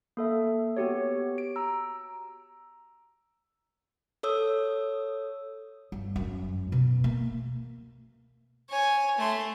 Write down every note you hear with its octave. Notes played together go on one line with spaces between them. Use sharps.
A#3 A4 E5
B3 F#4 G4 C#5
D7
A#5 E6
A4 C#5 D#6 E6
G2
F#2
B2
A#3
C#5 G#5
A3 C6